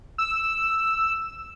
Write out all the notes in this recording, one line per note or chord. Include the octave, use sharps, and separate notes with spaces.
E6